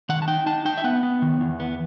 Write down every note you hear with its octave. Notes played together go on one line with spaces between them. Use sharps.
D#3 F#5
A5
D#4 G5
D#4 A5
D#4 G5
E5
B3 F#5
B3
D#3
E2
B3